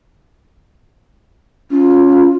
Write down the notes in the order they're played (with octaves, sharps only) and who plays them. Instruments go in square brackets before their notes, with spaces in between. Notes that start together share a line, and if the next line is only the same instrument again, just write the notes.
[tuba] C#4 [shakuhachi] F4